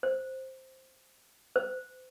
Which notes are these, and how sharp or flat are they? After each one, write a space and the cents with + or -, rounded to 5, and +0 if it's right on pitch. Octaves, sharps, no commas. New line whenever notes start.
C5 +5
C5 -40